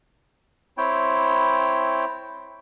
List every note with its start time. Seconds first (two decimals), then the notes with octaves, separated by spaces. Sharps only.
0.78 C4 E4 C#5 G5